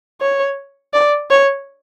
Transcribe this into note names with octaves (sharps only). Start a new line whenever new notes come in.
C#5
D5
C#5